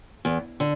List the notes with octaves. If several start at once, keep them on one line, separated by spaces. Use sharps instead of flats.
E2
D3